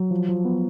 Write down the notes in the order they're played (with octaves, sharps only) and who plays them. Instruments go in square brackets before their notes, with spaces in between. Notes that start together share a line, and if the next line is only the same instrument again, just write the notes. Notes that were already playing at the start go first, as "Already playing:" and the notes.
Already playing: [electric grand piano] F#3
F3
F3
B3